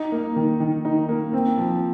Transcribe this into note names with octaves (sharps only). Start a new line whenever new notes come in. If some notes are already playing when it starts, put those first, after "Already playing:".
Already playing: D#4
A#3
D#3
D#3
D#4
A#3
C4
F3